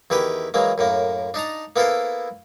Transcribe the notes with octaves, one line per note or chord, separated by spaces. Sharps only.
E2 D#3 E4 G4 B4 G5
E3 F#3 G#3 A#3
F#2 A2 A#3
D4 D#4 A5 A#5
A#3 B3 E4 A4 A#4 C5